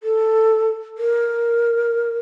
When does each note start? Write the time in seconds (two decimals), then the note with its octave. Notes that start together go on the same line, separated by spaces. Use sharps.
0.03 A4
0.98 A#4